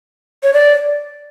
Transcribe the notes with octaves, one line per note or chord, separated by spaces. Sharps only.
C#5
D5